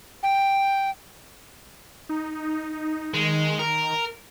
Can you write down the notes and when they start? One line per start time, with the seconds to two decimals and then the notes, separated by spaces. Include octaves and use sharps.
0.23 G5
2.09 D#4
3.14 D#3 G#3
3.59 A#4